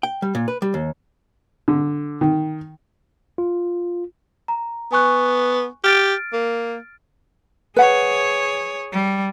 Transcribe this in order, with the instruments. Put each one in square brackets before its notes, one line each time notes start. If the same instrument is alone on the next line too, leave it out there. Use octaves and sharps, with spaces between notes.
[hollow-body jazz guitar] G5
G3
A#2
B4
G3
D#2
[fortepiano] D3
D#3
[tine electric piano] F4
[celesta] A#5
[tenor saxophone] B3 [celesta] G#5 C#6 F#6
[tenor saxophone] G4 [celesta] F6 A6 D7
[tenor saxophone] A#3
[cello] G#4 C#5 [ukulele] B4 F#5
[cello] G3